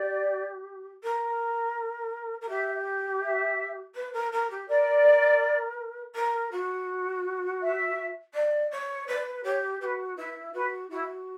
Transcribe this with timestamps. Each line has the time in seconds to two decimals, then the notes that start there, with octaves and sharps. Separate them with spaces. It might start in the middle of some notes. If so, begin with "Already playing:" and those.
Already playing: G4 D5
1.03 A#4
2.41 A#4
2.49 G4 E5
3.22 E5
3.95 B4
4.13 A#4
4.32 A#4
4.50 G4
4.68 A#4 D5
6.15 A#4
6.51 F#4
7.61 E5
8.34 D5
8.71 C#5
9.07 B4 D5
9.43 G4 C#5
9.80 G4 B4
9.84 F#4
10.17 E4 B4
10.53 F#4 B4
10.90 E4 F#4